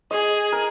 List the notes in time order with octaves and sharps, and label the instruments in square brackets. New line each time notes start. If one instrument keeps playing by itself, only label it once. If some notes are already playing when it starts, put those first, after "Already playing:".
[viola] G#4 [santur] D#5
[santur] A#4